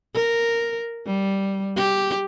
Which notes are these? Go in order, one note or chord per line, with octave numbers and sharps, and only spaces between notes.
A#4
G3
G4